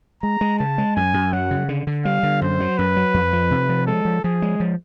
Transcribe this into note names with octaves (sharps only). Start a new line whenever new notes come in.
G#3 A#5
G#3
C#3 A5
G#3
F#2 G#5
F#2
F#3 F#5
C#3
D3
D3
G3 F5
D3
F#2 C5
F#3
F#2 B4
F#3
F2
F3
C3
F3
G#3 A4
F3
F3 G#4
G#3
F3